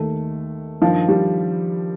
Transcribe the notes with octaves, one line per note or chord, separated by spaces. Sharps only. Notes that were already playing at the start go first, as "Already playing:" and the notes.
Already playing: D#2 D#3 A3
G2 D#3 F3
G3